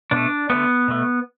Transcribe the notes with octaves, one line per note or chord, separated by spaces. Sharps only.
B2 A3 D4
D3 A3 B3
B2 A3